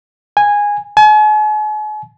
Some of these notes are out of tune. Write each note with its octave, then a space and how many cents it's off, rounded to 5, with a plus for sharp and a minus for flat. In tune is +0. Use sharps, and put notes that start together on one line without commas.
G#5 -10
G#5 +45